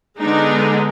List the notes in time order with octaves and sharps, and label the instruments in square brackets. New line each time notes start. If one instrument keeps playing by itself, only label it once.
[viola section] D3 G#3 B3 D4 D#4